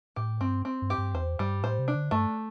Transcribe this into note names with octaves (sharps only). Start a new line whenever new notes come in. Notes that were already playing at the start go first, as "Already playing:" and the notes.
A2 G4
G2 C4
C4
G2
G4
G2
E2 C5
G2 G3
A2 C5
C3
D4
D3
G2 A3